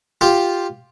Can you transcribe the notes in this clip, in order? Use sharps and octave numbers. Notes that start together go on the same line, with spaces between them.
F4 G4